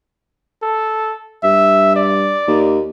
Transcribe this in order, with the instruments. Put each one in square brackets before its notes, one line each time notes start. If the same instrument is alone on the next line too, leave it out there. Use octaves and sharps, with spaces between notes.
[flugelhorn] A4
[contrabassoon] G2 [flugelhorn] E5
[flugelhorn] D5
[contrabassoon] D#2